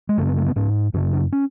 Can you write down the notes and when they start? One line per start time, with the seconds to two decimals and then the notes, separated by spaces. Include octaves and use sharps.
0.09 G#3
0.18 F#2 C#3 A3
0.27 B3
0.37 A3
0.46 B3
0.56 G#2 C#4
0.94 F#2 C#3 C#4
1.13 D4
1.32 C#4